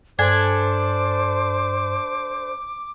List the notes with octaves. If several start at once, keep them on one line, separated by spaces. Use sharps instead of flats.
G2 D4 A4 C5 G#5 D6